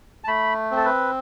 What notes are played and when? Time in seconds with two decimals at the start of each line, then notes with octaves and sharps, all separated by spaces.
0.24 A5
0.28 A3 B5
0.71 C4
0.76 A4
0.85 B4